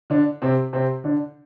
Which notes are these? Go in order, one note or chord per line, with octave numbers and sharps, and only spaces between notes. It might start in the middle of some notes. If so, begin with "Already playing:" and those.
D3 D4
C3 C4
C3 C4
D3 D4